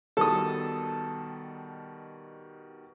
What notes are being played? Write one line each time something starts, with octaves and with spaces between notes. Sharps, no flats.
B2 D#3 G3 A4 D#6